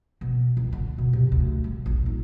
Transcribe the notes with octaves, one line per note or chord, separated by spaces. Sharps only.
B2
C#2
D3
B2
C3
D2
G3
A#1
D#4